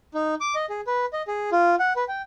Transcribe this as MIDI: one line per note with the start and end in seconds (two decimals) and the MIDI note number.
0.14 0.35 63
0.41 0.55 86
0.55 0.66 75
0.70 0.81 68
0.87 1.06 71
1.13 1.22 75
1.28 1.50 68
1.52 1.75 65
1.79 1.93 78
1.96 2.04 71
2.08 2.22 79